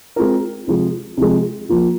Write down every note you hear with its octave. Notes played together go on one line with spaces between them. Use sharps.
G#3 C4 F4 A#4
C3 F3 G#3
C3 F3 G#3
F3 A#3 F4